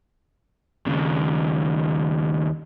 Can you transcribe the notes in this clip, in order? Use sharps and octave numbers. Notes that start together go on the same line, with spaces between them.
D#2 C#3